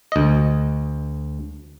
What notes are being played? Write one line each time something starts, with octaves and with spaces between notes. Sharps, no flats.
D2 D#5